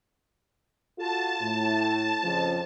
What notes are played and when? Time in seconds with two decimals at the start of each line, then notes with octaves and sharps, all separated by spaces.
0.98 F4 F#4 A4 A5
1.41 A2
2.24 F2 C#3 F3